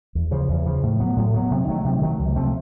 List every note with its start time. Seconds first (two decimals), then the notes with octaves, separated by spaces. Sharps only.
0.15 E2
0.31 C#3 F3
0.49 E2
0.66 C#3 F3
0.83 A2
1.00 F#3 B3
1.17 A2
1.34 F#3 B3
1.51 C3
1.67 D#3 F#3 A3
1.84 C3
2.02 D#3 F#3 A3
2.19 C#2
2.36 C3 F3 A3